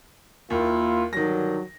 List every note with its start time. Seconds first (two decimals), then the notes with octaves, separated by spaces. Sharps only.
0.50 D#2 A#3 E4 F4
1.13 G2 D3 D#3 F#3 A#6